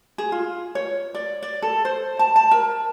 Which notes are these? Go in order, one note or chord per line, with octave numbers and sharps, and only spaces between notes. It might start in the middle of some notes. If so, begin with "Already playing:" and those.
G#4
F4
C#5
D5
D5
A4
C5
A5
A5
A#4